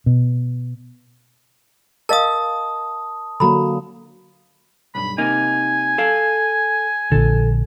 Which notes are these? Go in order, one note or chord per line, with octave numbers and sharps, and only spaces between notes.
B2
A#4 D#5 F5 A5 D#6
D3 F#3 A#3 A#5 B5
B1 G2 B5
C3 A#3 D#4 G#5
A4 F5
A#1 D3 A4